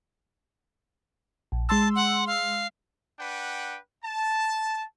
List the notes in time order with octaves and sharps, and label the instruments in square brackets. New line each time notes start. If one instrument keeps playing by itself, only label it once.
[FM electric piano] A#1
[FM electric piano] G#3 C6 E6 [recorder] A5
[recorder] F#5
F5
[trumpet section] D4 B4 F#5 G5
A5